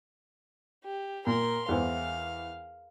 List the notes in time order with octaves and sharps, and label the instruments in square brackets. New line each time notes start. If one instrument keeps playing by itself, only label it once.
[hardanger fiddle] G4
[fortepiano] A#2 [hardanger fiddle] A#4 C6
[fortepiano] E2 E3 C5 [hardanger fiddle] F5